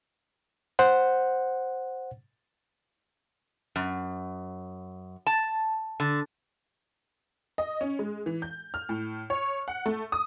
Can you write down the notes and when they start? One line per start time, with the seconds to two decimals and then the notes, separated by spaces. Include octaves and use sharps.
0.79 C5 F#5
3.76 F#2
5.27 A5
6.00 D3
7.58 D#5
7.81 C#4
7.99 G#3
8.26 E3
8.42 G6
8.74 F6
8.89 A2
9.30 C#5
9.68 F#5
9.86 A3
10.12 D#6